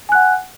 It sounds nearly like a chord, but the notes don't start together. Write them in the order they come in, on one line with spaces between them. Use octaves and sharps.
G#5 F#6 F#5